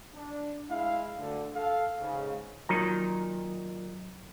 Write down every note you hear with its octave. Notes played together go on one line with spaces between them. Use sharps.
D4
G#3 E4 F5
D2 D3
A4 F5
G#2 C#3
A#2 D#3 F#3 D#4 A#5